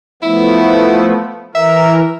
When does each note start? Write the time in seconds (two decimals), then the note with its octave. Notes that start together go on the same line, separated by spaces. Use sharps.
0.23 F3 A3 B3 E4
1.55 E3 A#4 E5